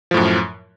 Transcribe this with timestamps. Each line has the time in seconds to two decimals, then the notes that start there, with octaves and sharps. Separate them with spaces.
0.11 F3
0.14 A2
0.17 F#2